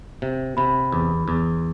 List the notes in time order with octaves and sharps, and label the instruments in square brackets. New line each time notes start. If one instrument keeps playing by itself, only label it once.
[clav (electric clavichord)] C3
[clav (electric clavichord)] C3 [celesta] B5
[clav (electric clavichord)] E2
E2